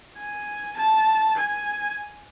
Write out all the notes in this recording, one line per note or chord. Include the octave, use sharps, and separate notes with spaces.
G#5
A5
G#5